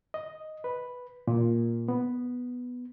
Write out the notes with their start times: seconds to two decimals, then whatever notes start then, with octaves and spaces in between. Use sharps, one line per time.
0.14 D#5
0.64 B4
1.27 A#2
1.88 B3